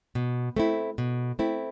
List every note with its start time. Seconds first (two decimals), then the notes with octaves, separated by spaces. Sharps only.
0.15 B2
0.56 A3 C4 E4
0.98 B2
1.39 A3 C4 E4